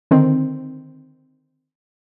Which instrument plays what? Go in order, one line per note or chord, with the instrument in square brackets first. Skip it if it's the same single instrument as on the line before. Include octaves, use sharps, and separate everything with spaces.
[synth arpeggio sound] D3 D#3 C4